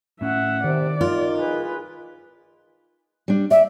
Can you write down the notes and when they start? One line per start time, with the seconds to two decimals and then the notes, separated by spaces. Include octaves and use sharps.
0.21 A2 C#4 E5 F#5
0.64 C3 D#3 D5
1.01 D#4 F4 A#4
1.39 G#4 B4
3.28 G3 D4
3.51 D5 E5